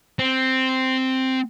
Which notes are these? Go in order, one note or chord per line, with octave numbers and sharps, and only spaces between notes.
C4